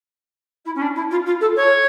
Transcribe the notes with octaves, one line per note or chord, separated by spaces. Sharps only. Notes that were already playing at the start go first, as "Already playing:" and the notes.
E4
C#4
D4
E4
F4
F4
A4
C#5